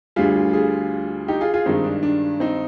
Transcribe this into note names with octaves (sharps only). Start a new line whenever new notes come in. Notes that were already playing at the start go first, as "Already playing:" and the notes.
D2 D3 G3 F4 G#4
F4 G#4
D#4 G4
F4 G#4
F4 G#4
G2 D#3 G#3 C4 D#4
D4
D4
C4 D#4